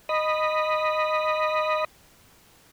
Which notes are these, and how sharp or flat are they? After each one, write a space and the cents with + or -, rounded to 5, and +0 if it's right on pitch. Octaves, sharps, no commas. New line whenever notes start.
D#5 -10 B5 +0